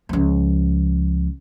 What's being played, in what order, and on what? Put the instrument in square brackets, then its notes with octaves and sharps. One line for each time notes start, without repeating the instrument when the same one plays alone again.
[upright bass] C#2 F3